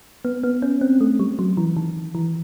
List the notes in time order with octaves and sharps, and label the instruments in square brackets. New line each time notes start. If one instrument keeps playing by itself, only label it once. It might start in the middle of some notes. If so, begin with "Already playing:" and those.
[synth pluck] B3
B3
C#4
C4
A3
G3
F#3
E3
D#3
E3